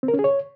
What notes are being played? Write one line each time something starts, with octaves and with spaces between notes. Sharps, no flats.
C4
A#4
C#4
G#4
C#5